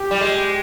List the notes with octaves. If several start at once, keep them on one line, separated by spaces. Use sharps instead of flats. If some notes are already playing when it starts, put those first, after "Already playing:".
Already playing: G4
G3
G#3